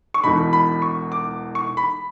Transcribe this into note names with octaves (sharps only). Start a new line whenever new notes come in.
C#6
E1 E2 B2 B5
B5
C#6
D6
C#6
B5